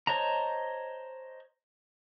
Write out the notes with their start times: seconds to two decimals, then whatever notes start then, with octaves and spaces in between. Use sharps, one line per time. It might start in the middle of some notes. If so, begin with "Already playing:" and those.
0.07 C5 C#5 D#5 A5 A#5